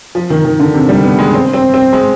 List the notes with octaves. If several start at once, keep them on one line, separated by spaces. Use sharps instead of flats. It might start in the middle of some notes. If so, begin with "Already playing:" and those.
F3
D#3
D#3
D3
C3
G3
B3
G#3
C4
C4
C4
G#3